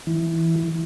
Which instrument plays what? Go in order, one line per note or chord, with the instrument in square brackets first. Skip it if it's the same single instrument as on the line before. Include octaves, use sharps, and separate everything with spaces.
[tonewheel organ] E3